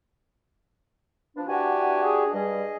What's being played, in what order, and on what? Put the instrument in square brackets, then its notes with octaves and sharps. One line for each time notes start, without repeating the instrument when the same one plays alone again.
[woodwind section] F3 B3 D4
[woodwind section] E3 F#5 G#5 [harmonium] D4 F#4 G4
[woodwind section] G#4
[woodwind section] G2 G3 [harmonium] G#4 D#5